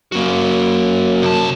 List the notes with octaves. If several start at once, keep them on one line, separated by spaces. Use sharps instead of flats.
F#2 A#3 F#4
C2 A5